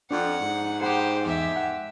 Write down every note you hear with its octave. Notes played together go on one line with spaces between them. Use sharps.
F2 D4 F#5
G#2
G4 G#4 C5 F#5 B5
E2 G4 E5
F#5